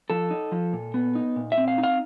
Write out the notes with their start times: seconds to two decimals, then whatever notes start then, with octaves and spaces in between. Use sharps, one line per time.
0.10 F3 A4
0.31 D#4
0.52 F3
0.73 A#2
0.94 B3
1.15 D#4
1.36 A#2
1.52 E5
1.57 C4
1.68 F5
1.78 D#4
1.83 F5